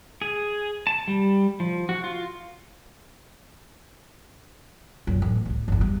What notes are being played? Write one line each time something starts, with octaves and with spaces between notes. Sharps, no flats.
G#4
A5
G3
F3
F#4
F4
F#2 A#2
A1
A1 D2
G1 E2
G3